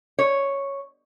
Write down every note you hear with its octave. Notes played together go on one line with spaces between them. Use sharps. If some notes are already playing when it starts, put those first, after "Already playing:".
C#5